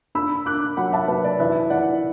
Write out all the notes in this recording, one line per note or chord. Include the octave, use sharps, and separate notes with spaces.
D4 B5 E6
D4 D6 F#6
F#3 F#5 B5
E5 A5
F#3 B4
D5
E3 B4 E5
E3 D5 F#5